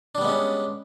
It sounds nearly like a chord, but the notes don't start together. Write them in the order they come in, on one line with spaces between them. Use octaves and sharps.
D4 G3 B3 G#3 C#4